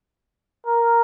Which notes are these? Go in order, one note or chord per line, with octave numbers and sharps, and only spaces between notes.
A#4